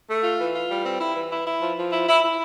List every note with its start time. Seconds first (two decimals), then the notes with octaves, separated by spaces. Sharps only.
0.09 A3
0.23 F4
0.40 E3
0.55 F4
0.70 G3
0.85 C4
1.00 E4
1.16 E3
1.31 E4
1.46 E4
1.62 F3
1.77 F3
1.92 E4
2.08 E4
2.23 E4